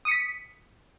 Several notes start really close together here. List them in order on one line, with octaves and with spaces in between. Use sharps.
D#6 C#7 B6